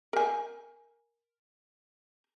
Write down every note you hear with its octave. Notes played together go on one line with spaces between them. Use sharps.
A#4 G#5